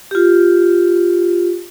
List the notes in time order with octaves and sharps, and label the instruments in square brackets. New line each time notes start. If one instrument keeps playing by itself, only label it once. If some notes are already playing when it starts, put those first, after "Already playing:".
[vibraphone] F4 G4